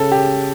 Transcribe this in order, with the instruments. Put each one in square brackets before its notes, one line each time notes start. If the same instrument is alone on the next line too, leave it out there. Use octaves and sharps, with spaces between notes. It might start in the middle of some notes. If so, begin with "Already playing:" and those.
Already playing: [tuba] C#3 [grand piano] A4
[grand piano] G4